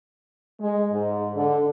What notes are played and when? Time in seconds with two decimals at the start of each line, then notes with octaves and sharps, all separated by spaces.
0.60 G#3
0.90 G#2
1.35 D3